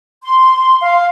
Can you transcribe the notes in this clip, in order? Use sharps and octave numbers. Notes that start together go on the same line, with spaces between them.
C6
F5